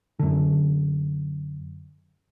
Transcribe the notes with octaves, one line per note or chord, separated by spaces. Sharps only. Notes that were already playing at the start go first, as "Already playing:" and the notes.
F#2 D3